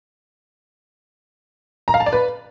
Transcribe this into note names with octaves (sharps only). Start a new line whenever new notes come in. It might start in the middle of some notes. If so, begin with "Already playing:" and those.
A#5
F5
A5
D5
B4